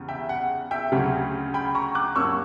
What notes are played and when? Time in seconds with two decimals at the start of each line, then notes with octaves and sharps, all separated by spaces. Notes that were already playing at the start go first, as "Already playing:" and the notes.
Already playing: E2 C#3 G3 B3
0.09 E5 G5
0.29 F#5
0.71 E5 G5
0.92 D2 C#3 F#3
1.54 G5 B5
1.75 A#5 C#6
1.95 D6 F#6
2.16 G2 F#3 A#3 C#4 C#6 E6